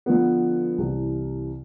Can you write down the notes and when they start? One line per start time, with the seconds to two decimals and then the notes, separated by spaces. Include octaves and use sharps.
0.06 D3 F3 B3
0.78 C2 C3 E3